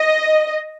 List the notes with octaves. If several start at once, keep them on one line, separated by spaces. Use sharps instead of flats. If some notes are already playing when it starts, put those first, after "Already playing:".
Already playing: D#5